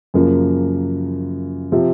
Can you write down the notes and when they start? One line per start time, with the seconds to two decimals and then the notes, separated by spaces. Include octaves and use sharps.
0.14 F#2 C#3 F3 A#3
1.72 C3 F3